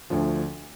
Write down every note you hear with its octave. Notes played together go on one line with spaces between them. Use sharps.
D2 D3 F3